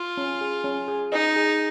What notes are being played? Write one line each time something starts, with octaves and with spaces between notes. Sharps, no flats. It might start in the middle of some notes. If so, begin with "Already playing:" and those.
Already playing: F4
C#4
G#4
C#4
G#4
D#4 D#5
G#4